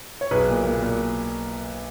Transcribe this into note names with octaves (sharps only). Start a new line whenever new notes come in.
C#5
B1 G#4 B4
A#2
A#2
A#2
A#2